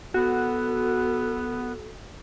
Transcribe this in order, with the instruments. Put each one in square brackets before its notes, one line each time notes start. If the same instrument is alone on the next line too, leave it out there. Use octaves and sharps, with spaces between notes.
[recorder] B3 [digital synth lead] F#4 [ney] A4